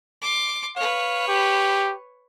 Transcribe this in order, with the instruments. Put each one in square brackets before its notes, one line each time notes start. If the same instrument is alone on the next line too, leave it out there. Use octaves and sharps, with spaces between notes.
[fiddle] C6 D6
[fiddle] B4 C#5 [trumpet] F5
[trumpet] G4